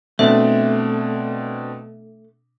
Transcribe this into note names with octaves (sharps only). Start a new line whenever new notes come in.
B2 A3 C4 D4 E5